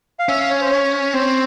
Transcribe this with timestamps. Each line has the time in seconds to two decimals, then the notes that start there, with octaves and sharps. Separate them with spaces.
0.19 F5
0.29 C#4 E5
0.39 F5
0.50 C#5
0.61 C5
0.71 C#5
1.13 C4 C5